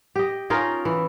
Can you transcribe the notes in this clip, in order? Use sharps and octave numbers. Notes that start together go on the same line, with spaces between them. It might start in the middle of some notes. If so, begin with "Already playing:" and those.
G4 D#5
C#4 D#4 F4 A#4
E3